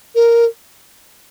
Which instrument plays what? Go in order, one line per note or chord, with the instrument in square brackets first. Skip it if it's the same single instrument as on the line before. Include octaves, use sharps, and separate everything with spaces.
[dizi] A#4